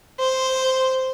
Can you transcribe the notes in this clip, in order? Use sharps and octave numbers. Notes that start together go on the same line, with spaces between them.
C5